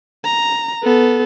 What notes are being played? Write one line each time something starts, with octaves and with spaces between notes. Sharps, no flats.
A#5
B3 A4